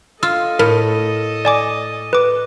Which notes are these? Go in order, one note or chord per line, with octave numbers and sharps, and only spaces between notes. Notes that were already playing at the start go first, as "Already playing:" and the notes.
F4 A4 D#5 E6
A2 A#4
D5 G#5 D6
B4 D6